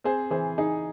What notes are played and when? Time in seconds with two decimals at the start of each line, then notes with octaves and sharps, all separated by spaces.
0.04 C4 G#4 C5
0.30 E3 G#4 C5
0.58 D#4 G#4